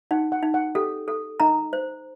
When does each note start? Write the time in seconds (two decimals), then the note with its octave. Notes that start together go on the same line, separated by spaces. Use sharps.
0.11 D#4 F#5
0.32 F#5
0.43 D#4
0.54 F#5
0.75 G4 A4
1.08 A4
1.40 D#4 A#5
1.73 C5